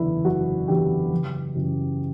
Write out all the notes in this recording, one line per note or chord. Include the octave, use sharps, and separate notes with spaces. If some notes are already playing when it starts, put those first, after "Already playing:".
Already playing: F#1 E2 D3 D4 E4
F#1 F#4
E2 D3 G4
F#1
F#2 C#3 E3